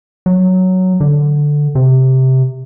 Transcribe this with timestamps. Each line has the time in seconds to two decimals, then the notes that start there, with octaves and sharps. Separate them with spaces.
0.26 F#3
1.00 D3
1.75 C3